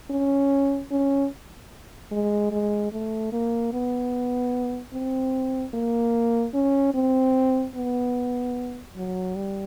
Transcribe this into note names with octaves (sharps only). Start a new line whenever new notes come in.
C#4
C#4
G#3
G#3
A3
A#3
B3
C4
A#3
C#4
C4
B3
F#3
G3